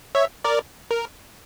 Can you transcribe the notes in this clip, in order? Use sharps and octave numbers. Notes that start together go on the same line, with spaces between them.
C#5 E5
A#4 D5
A#4